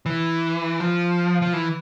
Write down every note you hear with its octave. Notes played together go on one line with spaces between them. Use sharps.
E3
F3
F3
E3